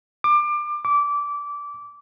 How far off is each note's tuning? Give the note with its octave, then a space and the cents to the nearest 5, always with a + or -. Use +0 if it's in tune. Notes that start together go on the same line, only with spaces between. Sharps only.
D6 +25
D6 -20